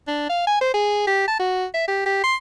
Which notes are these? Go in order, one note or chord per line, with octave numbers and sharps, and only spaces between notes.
D4
F5
G#5
C5
G#4
G4
A5
F#4
E5
G4
G4
C6